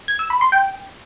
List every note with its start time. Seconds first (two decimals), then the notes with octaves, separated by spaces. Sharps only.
0.08 G#6
0.19 E6
0.30 B5
0.41 C6
0.52 G5